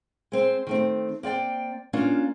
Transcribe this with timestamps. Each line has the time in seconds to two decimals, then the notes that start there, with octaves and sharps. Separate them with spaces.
0.32 G#3 C4 C5
0.67 D#3 A3 C4
1.23 A#3 C4 D5 G5
1.93 A#3 C#4 D4 F4